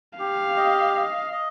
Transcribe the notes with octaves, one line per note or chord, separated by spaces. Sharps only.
G4 F5
D#5
D#5
D#5